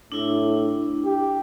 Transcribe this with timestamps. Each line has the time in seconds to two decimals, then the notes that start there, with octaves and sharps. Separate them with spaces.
0.12 A2 D4 E4
1.05 G4